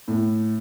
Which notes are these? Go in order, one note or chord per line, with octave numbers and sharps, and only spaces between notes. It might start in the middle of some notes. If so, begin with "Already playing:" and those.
A2